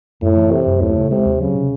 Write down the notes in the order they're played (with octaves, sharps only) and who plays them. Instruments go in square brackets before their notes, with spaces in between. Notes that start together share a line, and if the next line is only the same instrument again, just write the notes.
[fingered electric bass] F#2 [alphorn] A2
[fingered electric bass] E3
[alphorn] C3 [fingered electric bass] C4
[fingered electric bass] F#2
[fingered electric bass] D#2 [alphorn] A2
[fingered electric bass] C#3
[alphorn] C3 [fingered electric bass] G#3
[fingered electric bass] D#2
[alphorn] C#3 [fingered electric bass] F#3
[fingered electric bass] C3